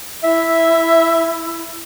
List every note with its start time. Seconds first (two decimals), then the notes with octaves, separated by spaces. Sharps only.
0.24 E4 E5